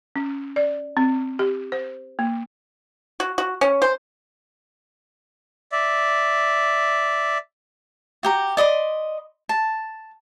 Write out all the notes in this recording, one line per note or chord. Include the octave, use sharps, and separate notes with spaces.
C#4
D5
C4
G4
C5
A#3
F#4
F#4
C#4
C5
D5 E5
F#4 G4 A#5
D5 D#5 B5 C6
A5